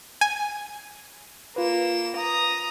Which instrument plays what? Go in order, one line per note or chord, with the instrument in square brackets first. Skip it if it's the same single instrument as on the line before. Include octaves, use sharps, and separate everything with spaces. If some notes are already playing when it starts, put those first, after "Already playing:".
[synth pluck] G#5
[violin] A#3 E7 [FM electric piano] F4 B4
[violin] A#5 D#6